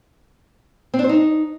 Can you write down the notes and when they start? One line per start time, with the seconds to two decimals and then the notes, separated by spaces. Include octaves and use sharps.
0.94 C4
0.99 D4
1.04 C5
1.09 D#4